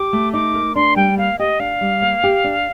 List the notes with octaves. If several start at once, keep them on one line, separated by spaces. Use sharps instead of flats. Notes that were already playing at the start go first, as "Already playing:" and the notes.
Already playing: G4 D6
A3
D#4 D6
A#4
D4 C6
G3 G5
A#3 F5
G4 D#5
D4 F5
G3
A#3
G4
D4